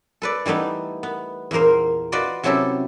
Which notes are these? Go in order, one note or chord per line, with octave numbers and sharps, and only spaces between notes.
A4 B4 D5
E3 G3 A3 B3 D#4
B3
E2 A#2 A#3 A#4 C5
F4 F#4 B4 D5 D#5
C3 F#3 C#4 E4 G4 A4